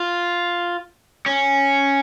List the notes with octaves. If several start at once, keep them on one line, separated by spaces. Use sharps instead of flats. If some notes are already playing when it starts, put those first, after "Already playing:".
Already playing: F4
C#4